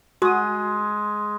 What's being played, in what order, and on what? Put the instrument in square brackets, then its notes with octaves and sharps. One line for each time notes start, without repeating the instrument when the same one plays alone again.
[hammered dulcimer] G#3 [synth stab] F#4 D#6